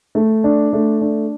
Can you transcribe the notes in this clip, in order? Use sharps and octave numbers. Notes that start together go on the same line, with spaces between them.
A3
D4
A3
D4